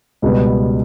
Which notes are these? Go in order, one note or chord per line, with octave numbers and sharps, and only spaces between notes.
C#2 B2 G3 B3